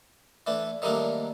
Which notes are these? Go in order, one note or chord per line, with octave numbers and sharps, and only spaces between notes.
E3 A3 D4
D#3 F#3 G3 A3 A#3 D4